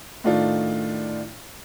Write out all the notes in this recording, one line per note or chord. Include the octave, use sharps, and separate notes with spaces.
A2 D#3 A3 D4 F4